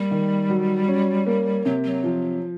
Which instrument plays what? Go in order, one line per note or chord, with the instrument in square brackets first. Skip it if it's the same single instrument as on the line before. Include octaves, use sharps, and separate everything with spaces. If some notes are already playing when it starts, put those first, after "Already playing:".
Already playing: [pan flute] G3 [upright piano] A#3
[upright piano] D#3
F#3
C#4
A#3
[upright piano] C3 [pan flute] F#3
[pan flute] F#3
[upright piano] F3